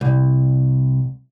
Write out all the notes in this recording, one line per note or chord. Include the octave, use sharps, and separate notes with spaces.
C2